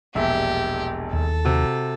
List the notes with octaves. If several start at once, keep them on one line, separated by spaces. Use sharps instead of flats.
E1 A#1 G4 E5
D#2 A4
C3 F#4